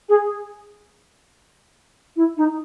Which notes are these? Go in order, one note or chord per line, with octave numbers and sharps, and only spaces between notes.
G#4
E4
D#4